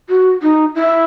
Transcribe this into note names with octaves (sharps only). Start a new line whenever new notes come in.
F#4
D#4
E4